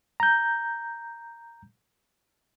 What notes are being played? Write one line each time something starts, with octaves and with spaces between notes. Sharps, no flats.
A#5 G6